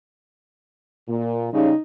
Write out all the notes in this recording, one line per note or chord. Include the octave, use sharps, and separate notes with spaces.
A#2
C#3 G3 D#4